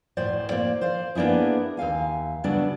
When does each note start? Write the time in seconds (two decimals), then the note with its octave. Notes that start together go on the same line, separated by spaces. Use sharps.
0.17 D2 A2 C5 D5
0.49 A#3 C5 D5
0.81 C5 D5 F5
1.15 A#3 B3 D4 E4 G#4
1.77 D#2 E5 F5 G#5
2.44 C#3 F#3 G3 B3 D4 A5